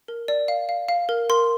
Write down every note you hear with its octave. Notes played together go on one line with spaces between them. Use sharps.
A#4
D5
F5
F5
F5
A#4
A#4 C6